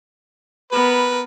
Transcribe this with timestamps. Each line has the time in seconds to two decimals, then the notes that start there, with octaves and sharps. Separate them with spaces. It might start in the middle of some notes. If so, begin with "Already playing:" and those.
0.72 B3 A#4 B4